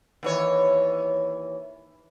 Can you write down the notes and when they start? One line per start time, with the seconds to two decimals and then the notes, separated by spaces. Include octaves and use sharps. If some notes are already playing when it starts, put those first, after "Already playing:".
0.23 D#2 E3 C#5